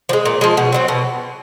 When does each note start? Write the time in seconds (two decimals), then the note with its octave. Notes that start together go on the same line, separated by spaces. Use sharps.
0.09 F3
0.13 G#3
0.25 A#2
0.41 F3 G#3
0.57 B2
0.72 F#3 A3 C4
0.88 B2